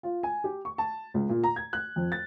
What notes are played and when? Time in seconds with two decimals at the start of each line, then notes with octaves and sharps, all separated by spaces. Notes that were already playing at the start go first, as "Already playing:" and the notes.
0.03 F4
0.23 G#5
0.44 G4
0.65 C#6
0.78 A5
1.14 C#2
1.29 A#2
1.44 A#5
1.56 G#6
1.73 F#6
1.96 F2
2.12 A6